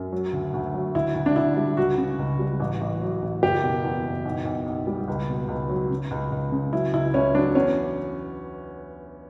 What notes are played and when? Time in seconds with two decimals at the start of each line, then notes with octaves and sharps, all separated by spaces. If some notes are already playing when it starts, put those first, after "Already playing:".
Already playing: F#2
0.12 F#3
0.33 D2
0.53 D2
0.74 F#3
0.95 D2 E4
1.15 D2
1.26 D4
1.36 D2 E4
1.57 G3
1.77 C#2 F#4
1.98 C#3
2.18 C#2
2.39 G3
2.60 A1
2.81 A1
3.01 F#3
3.22 A1
3.43 F#1 G4
3.64 B2
3.84 E2
4.05 F#1
4.25 B1
4.45 B1
4.66 B1
4.87 G3
5.08 C#2
5.29 B2
5.48 C#2
5.69 F#3
5.90 C#3
6.11 C#2
6.32 C#2
6.52 C#3
6.73 F#3 E4
6.93 C#2 E4
7.14 C#2 C#4
7.35 F#3 D4
7.55 E2 C#4